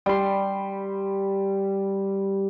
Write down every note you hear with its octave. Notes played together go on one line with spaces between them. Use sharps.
G3 C6